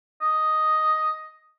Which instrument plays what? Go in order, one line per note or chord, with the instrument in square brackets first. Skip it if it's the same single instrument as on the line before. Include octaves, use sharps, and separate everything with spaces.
[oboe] D#5